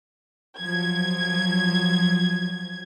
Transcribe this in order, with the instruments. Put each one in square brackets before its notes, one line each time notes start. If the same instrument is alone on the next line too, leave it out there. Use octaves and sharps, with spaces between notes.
[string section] F3 F#3 G#6